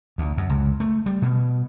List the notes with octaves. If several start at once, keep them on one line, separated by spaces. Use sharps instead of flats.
D2
F#2
C#2
A3
G3
B2